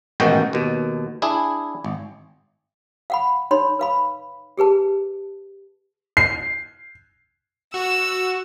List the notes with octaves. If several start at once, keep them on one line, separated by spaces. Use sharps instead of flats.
A1 G#2 B2 D#3 F#4 G5
D#2 B2
D4 E4 G#4
G#1
F5 F#5 B5
D#4 C#5 B5 C6
B4 F5 B5
G4 G#4 B4 A5
C7
F#4 E6